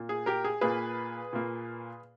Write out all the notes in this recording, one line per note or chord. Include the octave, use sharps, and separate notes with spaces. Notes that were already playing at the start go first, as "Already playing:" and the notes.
Already playing: A#2 A#3
G#4
G4 A#4
G#4
A#2 A#3 G#4 B4
A#2 A#3